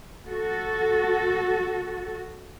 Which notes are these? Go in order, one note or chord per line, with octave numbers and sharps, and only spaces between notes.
F#4 A4